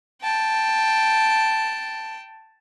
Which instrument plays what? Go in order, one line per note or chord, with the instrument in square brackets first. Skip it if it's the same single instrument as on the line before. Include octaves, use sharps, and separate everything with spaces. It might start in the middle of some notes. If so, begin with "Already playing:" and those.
[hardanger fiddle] G5 A5